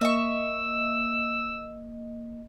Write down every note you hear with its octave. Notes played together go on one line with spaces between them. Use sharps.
A#3 D#5 E5 C#6 E6